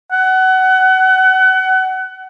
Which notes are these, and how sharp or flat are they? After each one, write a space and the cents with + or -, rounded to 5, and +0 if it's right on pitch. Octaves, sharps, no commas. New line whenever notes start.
F#5 +25